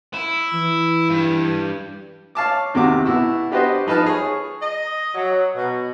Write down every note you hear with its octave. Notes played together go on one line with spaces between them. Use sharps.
E4
E3
G2
C#5 F5 A5 D6
E2 C3 D#3 F#4 D6
B2 E4 F#4 E6
D4 F#4 G4 B4 C5 D#5
F3 D#4 B4 A5 F6
G#4 C#5
D#5
F#3
B2